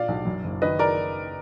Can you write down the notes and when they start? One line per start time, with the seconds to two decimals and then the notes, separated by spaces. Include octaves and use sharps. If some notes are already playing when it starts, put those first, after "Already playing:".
Already playing: A#2 D5 F5
0.08 B1
0.25 F#2
0.44 F#1
0.62 D#3 B4 D#5
0.79 A#4 D5